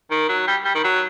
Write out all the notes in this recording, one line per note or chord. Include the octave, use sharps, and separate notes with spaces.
D#3
F#3
G3
G3
D#3
F#3